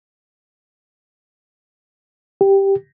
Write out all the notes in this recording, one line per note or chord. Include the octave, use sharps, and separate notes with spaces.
G4